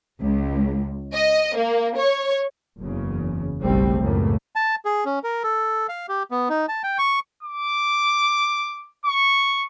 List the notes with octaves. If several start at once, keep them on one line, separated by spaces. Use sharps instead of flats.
C#2
D#5
A#3
C#5
F#1 E2 C#3
F#1 B1 G3 A3 C4
C#2 F#2 A2 C#3 A3 A#3
A5
G#4
C#4
A#4
A4
F5
G4
B3
D#4
A5
G5
C#6
D6
C#6